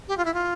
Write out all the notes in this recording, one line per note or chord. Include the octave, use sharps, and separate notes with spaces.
G4
F4
E4
F4